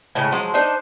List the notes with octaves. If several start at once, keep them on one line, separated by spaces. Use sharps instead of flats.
A2 C#3 G#3
F3 F#3 G#3
D4 D#4 C5